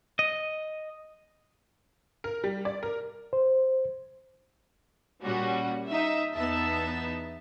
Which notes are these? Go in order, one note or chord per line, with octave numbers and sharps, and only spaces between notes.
D#5
A#4
G3
D5
A#4
C5
A#2 G3 C#4 F#4
D#4 E5
E2 B3 D#4 E5 A5